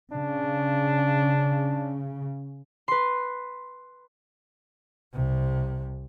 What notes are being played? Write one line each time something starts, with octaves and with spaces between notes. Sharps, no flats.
C#3 D4
B4 C6
C2 C3